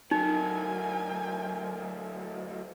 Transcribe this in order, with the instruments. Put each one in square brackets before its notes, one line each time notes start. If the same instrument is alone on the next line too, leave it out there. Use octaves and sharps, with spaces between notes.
[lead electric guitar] D2 F#3 [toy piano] D#4 [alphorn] A#4 [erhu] G#5